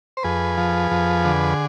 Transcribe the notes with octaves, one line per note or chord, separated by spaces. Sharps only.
C5
F2 G#4 B4
F3
F2
D3